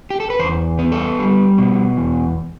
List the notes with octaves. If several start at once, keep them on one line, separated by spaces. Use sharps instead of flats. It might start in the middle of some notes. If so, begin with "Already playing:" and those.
G4
A4
B4
E2 C5
B3
A4
G3
B2
E2